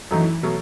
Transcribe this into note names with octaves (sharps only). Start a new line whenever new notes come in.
F#2 E3 F#3 A3 D#4
B2 F#3 A3